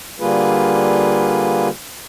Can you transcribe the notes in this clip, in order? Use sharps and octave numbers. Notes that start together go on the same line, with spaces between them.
D3 G3 A#3 F4 G#4 B4